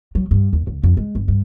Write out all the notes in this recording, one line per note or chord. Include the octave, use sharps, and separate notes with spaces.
F#3
G2
D#2
C#2
F2
G#3
G1
G2